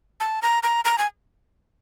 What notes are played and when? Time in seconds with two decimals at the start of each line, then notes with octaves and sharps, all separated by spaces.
0.20 A5
0.42 A#5
0.63 A#5
0.85 A#5
0.98 G#5